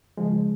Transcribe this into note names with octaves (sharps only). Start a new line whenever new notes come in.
C#3 F3 G#3